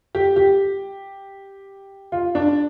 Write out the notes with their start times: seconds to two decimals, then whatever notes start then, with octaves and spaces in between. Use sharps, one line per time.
0.15 G4
0.36 G4
2.12 F4
2.35 D4